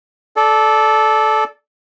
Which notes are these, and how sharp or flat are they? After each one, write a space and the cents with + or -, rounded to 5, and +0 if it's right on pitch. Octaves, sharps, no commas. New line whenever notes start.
A4 -15 D5 +0